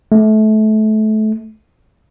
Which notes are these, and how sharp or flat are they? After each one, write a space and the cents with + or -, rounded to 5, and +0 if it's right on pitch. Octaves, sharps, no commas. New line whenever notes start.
A3 -25